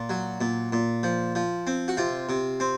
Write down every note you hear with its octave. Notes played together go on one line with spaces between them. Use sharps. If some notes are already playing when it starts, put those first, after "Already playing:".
Already playing: A#2
F#3
A#2
A#2
F3
F3
C4
F#4
C3 F4
C3
C4